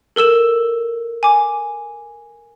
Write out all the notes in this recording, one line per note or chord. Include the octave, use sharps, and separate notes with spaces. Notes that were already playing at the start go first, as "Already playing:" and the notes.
A4 A#4 E6 E7
G#5 D6